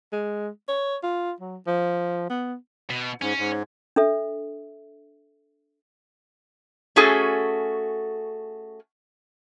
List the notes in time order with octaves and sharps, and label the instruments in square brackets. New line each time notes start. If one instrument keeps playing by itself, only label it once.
[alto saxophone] G#3
C#5
F4
F#3
F3
B3
[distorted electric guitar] B2
[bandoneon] G#2 [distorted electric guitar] C#4
[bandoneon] G#2
[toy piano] D4 A4 E5
[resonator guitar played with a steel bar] A3 C#4 F#4 G#4 A4